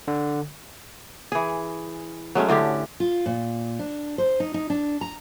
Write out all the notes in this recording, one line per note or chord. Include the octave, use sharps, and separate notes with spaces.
D3
E3 G#4
F#3 G#3 A3 C#4
A2 D3 C#4 G4
F4
A#2
D4
C5
D#4
D#4
D4
A#5